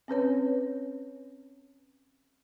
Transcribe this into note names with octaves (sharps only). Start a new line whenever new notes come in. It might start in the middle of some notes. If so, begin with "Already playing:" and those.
C4 C#4 B4 C#5